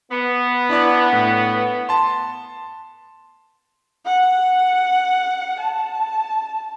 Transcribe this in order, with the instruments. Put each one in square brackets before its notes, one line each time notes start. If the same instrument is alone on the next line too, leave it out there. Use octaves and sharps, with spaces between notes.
[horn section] B3
[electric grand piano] D4 E4 D5
A2
A5 C6
[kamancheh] F#5
A5